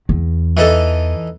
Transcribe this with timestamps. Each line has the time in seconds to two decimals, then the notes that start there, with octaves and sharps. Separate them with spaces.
0.09 E2
0.57 E3 D#4 A4